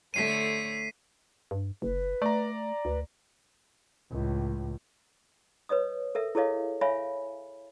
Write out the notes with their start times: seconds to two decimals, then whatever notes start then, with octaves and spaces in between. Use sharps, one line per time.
0.14 D3 A3 C#5 B6 C7 D#7
1.51 G2
1.82 F#1 B4
2.22 A3 D5 A#5
2.85 D2 B4
4.10 C#2 A2
5.69 B4 C#5 D#5 D#6
6.15 A4 A#4 E5
6.35 E4 G#4 A4 C#5 D#5 F5
6.81 C#5 E5 F5 G#5 B5